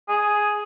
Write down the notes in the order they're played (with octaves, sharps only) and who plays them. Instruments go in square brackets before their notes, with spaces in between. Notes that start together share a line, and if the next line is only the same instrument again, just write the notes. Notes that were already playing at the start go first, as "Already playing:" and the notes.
[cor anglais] G#4